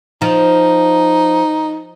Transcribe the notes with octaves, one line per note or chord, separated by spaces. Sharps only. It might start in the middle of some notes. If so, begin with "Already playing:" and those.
F3 D#4